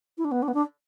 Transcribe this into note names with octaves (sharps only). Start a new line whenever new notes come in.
E4
D4
B3
D4
B3
D4